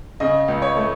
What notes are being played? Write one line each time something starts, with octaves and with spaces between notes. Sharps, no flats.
C#3 D#5
C#2
C#5
A3